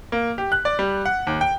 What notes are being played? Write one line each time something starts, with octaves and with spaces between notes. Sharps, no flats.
A#3
G4
F#6
D5
G3
F#5
D#2
G5